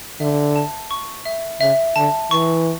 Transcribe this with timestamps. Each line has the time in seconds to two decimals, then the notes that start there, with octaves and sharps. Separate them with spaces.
0.20 D3 E5
0.56 A5
0.91 C#6
1.25 E5
1.61 C#3 E5
1.96 D3 A5
2.31 E3 C#6